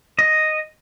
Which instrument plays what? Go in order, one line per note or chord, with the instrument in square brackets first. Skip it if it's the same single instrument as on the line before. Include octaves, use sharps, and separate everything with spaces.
[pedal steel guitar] D#5